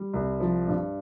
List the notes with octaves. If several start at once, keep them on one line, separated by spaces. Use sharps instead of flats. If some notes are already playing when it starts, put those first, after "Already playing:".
Already playing: G3
C2
F3
G2